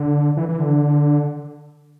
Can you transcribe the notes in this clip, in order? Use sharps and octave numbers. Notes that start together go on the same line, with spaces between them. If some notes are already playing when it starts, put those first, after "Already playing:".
Already playing: D3
E3
E3
D3